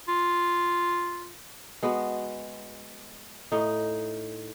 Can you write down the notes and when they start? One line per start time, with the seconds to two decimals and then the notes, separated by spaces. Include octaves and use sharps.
0.08 F4
1.83 G#3 B3 F#4
3.52 A2 D#4